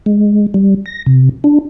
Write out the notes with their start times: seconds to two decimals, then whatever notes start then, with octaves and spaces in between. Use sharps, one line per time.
0.06 G#3
0.54 G3
0.86 A#6
1.06 C3
1.44 D4